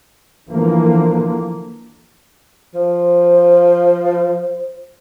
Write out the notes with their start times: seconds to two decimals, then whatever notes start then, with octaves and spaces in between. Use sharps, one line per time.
0.49 D3 E3 F3 A#3
2.75 F3 C5